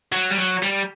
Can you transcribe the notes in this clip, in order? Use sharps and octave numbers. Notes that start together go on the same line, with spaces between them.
F#3
G3
F#3
G3